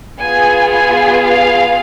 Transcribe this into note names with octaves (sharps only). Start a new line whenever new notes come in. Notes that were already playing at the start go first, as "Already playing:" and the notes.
B3 F4 G#4 G#5
G#5
F5